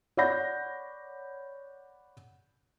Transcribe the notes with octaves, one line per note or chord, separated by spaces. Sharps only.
C#5 D5 F#5 B5 G6 A#6